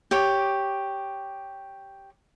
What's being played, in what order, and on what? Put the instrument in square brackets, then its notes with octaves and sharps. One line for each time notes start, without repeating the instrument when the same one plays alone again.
[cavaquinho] G4 C#5 D6